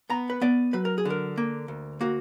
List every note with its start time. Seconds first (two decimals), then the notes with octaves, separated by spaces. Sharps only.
0.10 B3 A#5
0.30 B4
0.41 B3 D5
0.73 F#3 B4
0.85 A#4
0.98 G#4
1.05 D3 A#4
1.38 A#3
1.68 D2
2.01 A#3 F#4